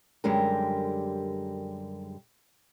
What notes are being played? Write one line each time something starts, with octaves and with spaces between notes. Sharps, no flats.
F#2 D3 G3 G#3 G4 A#4